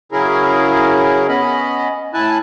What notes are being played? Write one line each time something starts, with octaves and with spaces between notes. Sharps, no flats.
C#3 F#3 C#4 E4 G#4 A#4
B3 C#4 D#5 B5
A2 E4 G#5 A5 F#6